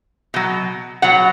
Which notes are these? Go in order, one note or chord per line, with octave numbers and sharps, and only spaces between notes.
B2 F#3
B2 F#3 F#5